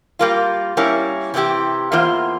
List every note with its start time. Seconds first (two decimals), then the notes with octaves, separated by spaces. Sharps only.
0.19 G3 A#3 F4
0.77 G3 A#3 C#4 E4
1.34 C3 E3 G#3 E4 G4
1.92 E2 E3 A#3 F4 C5